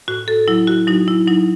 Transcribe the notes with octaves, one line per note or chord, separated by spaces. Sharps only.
A2 F#4
A4
F#3 E4
F#4
F#3 D#4
E4
F#3 D#4